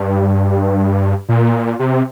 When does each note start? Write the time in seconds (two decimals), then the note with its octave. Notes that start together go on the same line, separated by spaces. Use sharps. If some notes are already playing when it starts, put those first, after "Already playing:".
Already playing: G2
1.29 A#2
1.79 C3